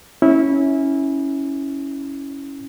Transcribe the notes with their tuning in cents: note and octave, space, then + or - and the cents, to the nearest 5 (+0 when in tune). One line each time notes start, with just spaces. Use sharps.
C#4 +0 E4 -20